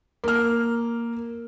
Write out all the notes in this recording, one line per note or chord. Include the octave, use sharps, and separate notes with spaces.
A#3 F6